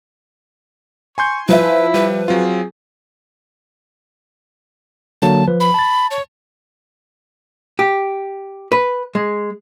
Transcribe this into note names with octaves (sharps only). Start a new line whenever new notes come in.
G#5 C6 C#6 G6
F3 E4 B4 E5
G3 B4
F#3 C4 F4 G#4
D3 F#3 A#3 A5
F3 B4
B5
A5 A6
C#5
G4
B4
G#3